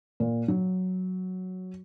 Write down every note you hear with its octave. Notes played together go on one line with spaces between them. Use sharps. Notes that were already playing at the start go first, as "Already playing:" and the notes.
A#2
F#3